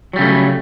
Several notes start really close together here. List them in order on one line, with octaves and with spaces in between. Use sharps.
F#3 G3 C#3 A3